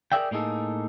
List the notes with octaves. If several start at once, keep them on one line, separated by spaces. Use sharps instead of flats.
G#4 A#4 D5 E5 F5 G5
A2 A#3 D#4 G#4 A4